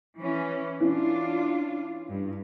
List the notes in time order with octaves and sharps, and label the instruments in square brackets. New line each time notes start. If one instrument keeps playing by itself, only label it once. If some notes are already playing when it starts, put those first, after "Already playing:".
[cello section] E3 C#4
[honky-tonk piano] E3 C#4 [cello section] D4 F4
[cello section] G2